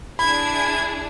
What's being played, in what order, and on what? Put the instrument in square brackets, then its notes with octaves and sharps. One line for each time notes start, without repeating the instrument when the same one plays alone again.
[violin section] D4 E4 G#4 [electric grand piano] B5 [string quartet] G#6